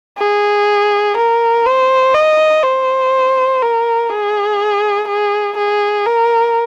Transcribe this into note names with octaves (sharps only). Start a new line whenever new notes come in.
G#4
A#4
C5
D#5
C5
A#4
G#4
G#4
G#4
A#4